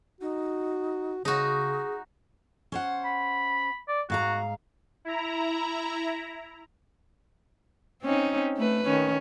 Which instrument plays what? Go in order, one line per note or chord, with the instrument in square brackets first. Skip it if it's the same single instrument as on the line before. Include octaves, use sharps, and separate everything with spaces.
[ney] D#4 [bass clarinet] F#4
[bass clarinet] C#3 [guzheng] D#4 F#4 [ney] G#4
[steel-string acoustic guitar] C#4 C5 F#5
[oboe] B5
D5
[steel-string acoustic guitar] G#2 F5 A#5 [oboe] F#4
[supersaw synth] E4 A#5
[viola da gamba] C4 C#4 D#4
A3 B4
D#3 C#4